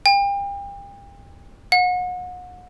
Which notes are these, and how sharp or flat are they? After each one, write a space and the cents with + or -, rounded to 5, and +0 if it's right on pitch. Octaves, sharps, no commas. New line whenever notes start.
G5 +35
F#5 -35